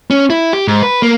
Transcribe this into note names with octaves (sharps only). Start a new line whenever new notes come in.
C#4
E4
G4
G#2
B4
A#3